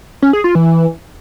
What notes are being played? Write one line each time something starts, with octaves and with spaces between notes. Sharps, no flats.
C#4
G#4
F4
E3